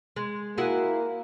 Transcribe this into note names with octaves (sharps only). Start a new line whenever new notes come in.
G#3
A#3 E4 F#4 G#4